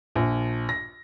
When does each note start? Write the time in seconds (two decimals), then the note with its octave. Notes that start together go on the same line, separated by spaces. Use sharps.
0.16 A#1
0.69 A#6